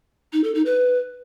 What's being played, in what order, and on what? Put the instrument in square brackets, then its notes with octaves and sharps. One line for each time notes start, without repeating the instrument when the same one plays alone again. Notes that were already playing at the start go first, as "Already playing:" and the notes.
[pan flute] D#4
A4
D#4
B4